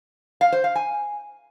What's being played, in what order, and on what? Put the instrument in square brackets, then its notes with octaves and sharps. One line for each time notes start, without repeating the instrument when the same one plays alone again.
[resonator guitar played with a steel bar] F5
C5
F5
G#5